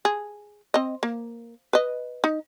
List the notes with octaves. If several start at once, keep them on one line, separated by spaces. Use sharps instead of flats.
G#4
C4 D#5
A#3
B4 D#5
D#4